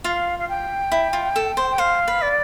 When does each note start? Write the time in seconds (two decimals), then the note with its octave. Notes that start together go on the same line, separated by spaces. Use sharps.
0.04 F4 F5
0.39 F5
0.49 G5
0.92 E4
1.13 F4
1.36 A4
1.57 C5
1.71 G5
1.78 C5 F5
2.08 B4
2.22 D5